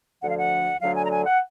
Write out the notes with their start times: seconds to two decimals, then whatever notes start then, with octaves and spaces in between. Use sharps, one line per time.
0.22 D2 D3 F3 F#5
0.30 F5
0.38 F#5
0.81 D2 D3 F#3 F5
0.96 G#5
1.05 A#5
1.11 G#5
1.26 F#5